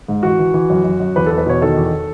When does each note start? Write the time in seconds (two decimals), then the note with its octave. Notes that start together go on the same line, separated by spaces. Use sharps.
0.08 G#2
0.23 E3 F#4
0.39 E3
0.54 E3
0.70 F#2
0.84 F#2
1.00 F#2
1.16 E2 B4
1.26 E2 A4
1.38 B4
1.46 B2 C#5
1.61 D#3 A4
1.77 E2